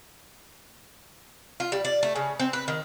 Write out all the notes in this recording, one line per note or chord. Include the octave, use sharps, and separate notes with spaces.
F4
G3
D5
A3
C#3
C4
B4
D#3